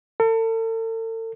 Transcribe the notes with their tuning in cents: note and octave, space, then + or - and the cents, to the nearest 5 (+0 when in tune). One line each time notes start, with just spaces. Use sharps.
A4 +40